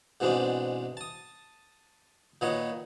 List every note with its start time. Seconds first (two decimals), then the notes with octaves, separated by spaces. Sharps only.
0.20 G#2 B2 E3 G#3 C4 D4
0.97 A5 D#6
2.41 A#2 D#3 B3 C#5 D#5